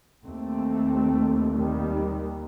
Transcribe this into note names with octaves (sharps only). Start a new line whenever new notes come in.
D#2 A3 C4
D#3 G3